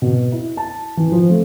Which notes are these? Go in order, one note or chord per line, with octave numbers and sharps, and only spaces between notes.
B2
E4
A5
E3
F3
A3